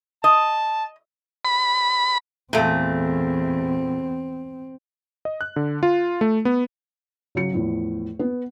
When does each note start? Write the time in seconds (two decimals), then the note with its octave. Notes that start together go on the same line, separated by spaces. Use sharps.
0.24 D#5 A5
1.45 B5
2.53 E2 A#2 A3 C4
5.25 D#5
5.41 F#6
5.56 D3
5.83 F4
6.21 A3
6.45 B3
7.35 C#3 F#3 C#7
7.52 E2 A2 F3
8.19 B3